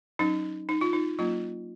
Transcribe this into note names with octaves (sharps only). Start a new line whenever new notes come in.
F#3 C#4 D#4
D#4
F4
D#4
F#3 A#3 C#4 F4